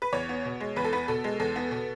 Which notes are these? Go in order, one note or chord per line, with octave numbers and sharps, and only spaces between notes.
B4
E2 C#5
B3
B2
G#3
E2 B4
A4
B3 B4
B2 A4
G#3
E2 A4
B3
B2